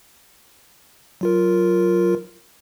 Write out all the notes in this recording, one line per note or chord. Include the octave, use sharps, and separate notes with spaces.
F#3 F4 A#4